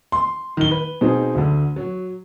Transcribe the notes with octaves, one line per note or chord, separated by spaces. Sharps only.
C6
D#3 G7
B4
B2 C4 D#4 G#4
D2 D3
F#3